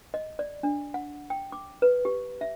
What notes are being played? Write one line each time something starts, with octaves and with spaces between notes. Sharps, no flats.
D#5
D5
D4
F#5
G5
D6
B4
G4
E5